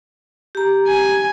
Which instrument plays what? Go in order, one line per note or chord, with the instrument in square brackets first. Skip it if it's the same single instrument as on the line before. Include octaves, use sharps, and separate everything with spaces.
[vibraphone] G4 A#5
[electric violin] G#5